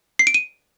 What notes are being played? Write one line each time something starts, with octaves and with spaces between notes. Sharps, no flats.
C7
D7
D#7